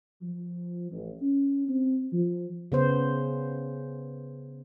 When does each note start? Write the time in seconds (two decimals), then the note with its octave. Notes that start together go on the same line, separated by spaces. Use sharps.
0.22 F3
0.92 A1
1.22 C#4
1.69 C4
2.12 F3
2.72 C#3 B3 C5